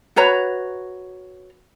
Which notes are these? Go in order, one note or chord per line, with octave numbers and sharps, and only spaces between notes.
F#4 B4 C#5 A#5